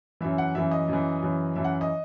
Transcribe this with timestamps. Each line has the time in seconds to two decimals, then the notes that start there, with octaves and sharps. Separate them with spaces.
0.21 F#2 E3 E5
0.38 F#5
0.55 F#2 E3 E5
0.71 D#5
0.88 F#2 E3
1.23 F#2 E3
1.56 F#2 E3 E5
1.64 F#5
1.81 D#5